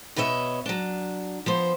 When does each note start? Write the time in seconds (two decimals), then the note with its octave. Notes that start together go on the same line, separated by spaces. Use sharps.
0.16 B2 B4 C#5 D#5 E5
0.66 F#3 D4
1.46 F3 B3 C5